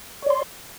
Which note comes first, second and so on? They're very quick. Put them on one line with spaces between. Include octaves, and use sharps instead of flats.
C#5 D5 C6